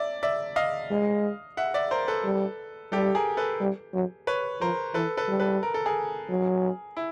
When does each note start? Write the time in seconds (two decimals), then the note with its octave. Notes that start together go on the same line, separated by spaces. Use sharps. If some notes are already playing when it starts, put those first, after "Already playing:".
Already playing: D5 E5
0.23 D5 E5
0.56 D#5 F5
0.90 G#3
1.57 E5 F#5
1.74 D5 E5
1.91 A#4 C5
2.08 A4 B4
2.25 G3
2.92 G3 G4 A4
3.15 G#4 A#4
3.37 A4 B4
3.60 G3
3.93 F#3
4.27 B4 C#5
4.60 F3 A#4 C5
4.94 E3 A4 B4
5.17 A4 B4
5.28 G3
5.40 A4 B4
5.63 A#4
5.74 A4
5.85 G#4 A#4
6.29 F#3
6.97 E4